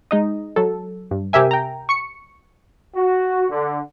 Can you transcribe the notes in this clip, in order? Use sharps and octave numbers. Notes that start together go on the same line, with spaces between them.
G#3 D#4 D#5
F#3 A4
G2
C3 G4 A#4 E5 G#5
G5 A#5
C#6 C#7
F#4
D3